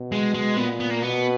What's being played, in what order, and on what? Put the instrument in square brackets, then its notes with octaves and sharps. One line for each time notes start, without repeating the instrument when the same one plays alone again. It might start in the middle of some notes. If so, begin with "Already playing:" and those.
Already playing: [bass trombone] B2
[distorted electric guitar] G#3
G#3
[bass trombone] A#2 [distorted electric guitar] B3
[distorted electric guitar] B3
A#3
[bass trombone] B2 [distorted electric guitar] B3